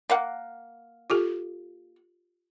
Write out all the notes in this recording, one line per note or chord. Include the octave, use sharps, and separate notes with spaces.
A#3 F5 F#5
F4 G4 A4